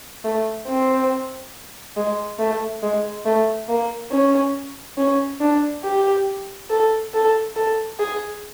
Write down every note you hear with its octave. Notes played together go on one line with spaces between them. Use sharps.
A3
C4
G#3
A3
G#3
A3
A#3
C#4
C#4
D4
G4
A4
A4
A4
G#4